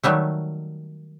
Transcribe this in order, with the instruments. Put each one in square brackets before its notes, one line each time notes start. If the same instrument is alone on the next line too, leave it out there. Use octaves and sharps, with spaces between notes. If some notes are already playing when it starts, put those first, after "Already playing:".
[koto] D#3 F#3 G3 A3